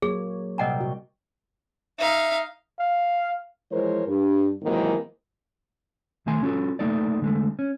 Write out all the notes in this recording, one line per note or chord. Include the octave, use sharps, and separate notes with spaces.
F#3 A#3 G#4 C#5
C2 A#2 D#5 F#5 G5 A#5
F#4
D#4 E5 F5
F5
E3 F3 G#3 A#4 C5 C#5
G2
G#2 C3 D#3 E3 F#3 A#3
B1 D#3 A3 G#5 C6
C#4 F4 F#4 A4
A3 A#3 D#4 A4 D5
D3 G#3 A3
C#4